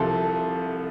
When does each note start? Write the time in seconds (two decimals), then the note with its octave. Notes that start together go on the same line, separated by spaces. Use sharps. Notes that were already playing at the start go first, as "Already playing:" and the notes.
Already playing: C2 C3 F3 A4